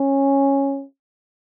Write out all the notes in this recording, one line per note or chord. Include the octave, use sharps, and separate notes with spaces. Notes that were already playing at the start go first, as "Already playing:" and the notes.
Already playing: C#4